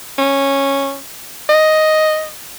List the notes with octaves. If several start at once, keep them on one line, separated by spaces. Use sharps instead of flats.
C#4
D#5